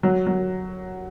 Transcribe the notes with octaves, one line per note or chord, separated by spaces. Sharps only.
F#3
F#3